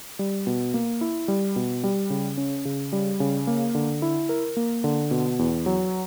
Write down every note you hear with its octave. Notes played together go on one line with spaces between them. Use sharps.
G3
B2
A#3
E4
G3
B2
G3
C#3
C#4
C#3
G3
C#3
A#3
D3
E4
A#4
A#3
D3
B2
E2
F#3